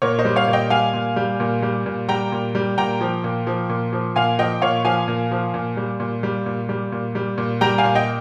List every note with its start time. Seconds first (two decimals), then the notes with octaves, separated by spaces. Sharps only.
0.02 A#2 A#4 C#5
0.19 C5 D#5
0.25 G3
0.36 C#5 F5
0.48 A#2
0.53 D#5 G5
0.70 G3 F5 G#5
0.94 A#2
1.16 G3
1.40 A#2
1.62 G3
1.86 A#2
2.09 G3 G5 A#5
2.32 A#2
2.55 G3
2.78 A#2 G5 A#5
3.01 F3
3.24 A#2
3.47 F3
3.69 A#2
3.93 F3
4.16 A#2 F5 G#5
4.39 F3 D#5 G5
4.62 A#2 C#5 F5
4.85 F3 F5 G#5
5.08 A#2
5.31 F3
5.54 A#2
5.77 G3
6.00 A#2
6.23 G3
6.46 A#2
6.69 G3
6.92 A#2
7.15 G3
7.38 A#2
7.61 G3 G5 A#5
7.78 F5 G#5
7.84 A#2
7.95 D#5 G5